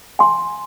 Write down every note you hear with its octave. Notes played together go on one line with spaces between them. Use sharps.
G#5 C6